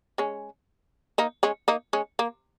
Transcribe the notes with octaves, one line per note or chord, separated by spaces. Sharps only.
G#3 C#4
A#3 D#4
G#3 C#4
A#3 D#4
G#3 C#4
A#3